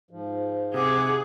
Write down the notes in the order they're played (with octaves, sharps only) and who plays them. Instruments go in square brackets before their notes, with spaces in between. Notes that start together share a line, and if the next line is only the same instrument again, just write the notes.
[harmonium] G#2 F3
[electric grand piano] C3 [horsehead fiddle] G#4 [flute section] F#5 D6